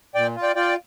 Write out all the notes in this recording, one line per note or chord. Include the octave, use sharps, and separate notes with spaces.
A#2 D5 G5
F4
D5 G5
F4 D5 G5